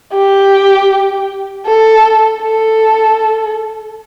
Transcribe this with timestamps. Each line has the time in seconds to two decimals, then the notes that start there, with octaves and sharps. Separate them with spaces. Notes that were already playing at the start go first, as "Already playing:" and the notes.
0.13 G4
1.66 A4
2.42 A4